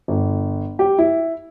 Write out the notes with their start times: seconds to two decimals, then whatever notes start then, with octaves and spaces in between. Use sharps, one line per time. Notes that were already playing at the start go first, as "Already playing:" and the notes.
0.08 G1
0.79 G4
0.99 E4